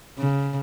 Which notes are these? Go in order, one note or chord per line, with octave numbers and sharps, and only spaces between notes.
C#3